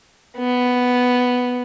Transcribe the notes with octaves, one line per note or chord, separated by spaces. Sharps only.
B3